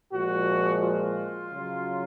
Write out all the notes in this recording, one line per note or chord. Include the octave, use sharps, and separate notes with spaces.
A#2 F3 G#3 F#4
F4
C#3 F#3